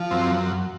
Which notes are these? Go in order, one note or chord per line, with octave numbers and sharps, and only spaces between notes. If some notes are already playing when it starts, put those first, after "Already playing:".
Already playing: F3
F#2 C4